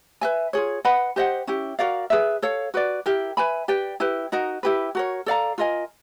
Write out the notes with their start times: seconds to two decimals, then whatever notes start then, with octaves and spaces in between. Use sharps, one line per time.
0.21 B4 E5 G#5
0.53 F4 G#4 C#5
0.85 B4 D#5 F#5 B5
1.16 G4 C5 D#5 F#5
1.47 C#4 E4 G4
1.79 F#4 A#4 D5 F5
2.10 G#4 B4 E5
2.42 A4 C#5 F5
2.74 F#4 B4 D5
3.06 E4 G4 A#4
3.37 B4 E5 G#5 B5
3.68 G4 B4 D5 G5
4.00 E4 G4 B4
4.32 D#4 F#4 A#4 D#5
4.63 E4 G4 B4
4.95 F#4 A#4 C#5
5.26 A4 D5 F5 A#5
5.58 F4 A#4 D#5 G#5